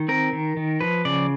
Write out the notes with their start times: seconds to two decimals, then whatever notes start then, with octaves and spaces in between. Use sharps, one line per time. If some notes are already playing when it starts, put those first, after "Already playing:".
Already playing: D#3
0.08 C4 A#4
0.33 D#3
0.57 D#3
0.81 F3 B4
1.05 C#3 D5